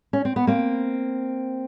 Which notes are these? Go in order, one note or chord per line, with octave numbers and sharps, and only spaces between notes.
C#4
C4
B3
A#3 C4